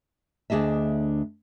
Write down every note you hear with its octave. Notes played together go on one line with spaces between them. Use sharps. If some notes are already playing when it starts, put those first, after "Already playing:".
D2 D4 G#4 D#5 E5